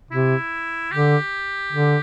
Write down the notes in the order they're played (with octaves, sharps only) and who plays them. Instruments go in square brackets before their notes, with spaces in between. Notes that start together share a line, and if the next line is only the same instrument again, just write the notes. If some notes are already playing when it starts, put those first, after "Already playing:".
[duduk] C3 [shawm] E4
[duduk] D3 [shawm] G4
[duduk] D3